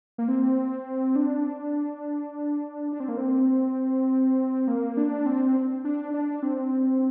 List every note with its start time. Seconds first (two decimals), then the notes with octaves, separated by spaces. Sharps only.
0.18 A#3
0.28 C4
1.16 D4
2.93 D4
3.00 C4
3.08 A#3
3.17 C4
4.68 A#3
4.97 D4
5.26 C4
5.84 D4
6.14 D4
6.43 C4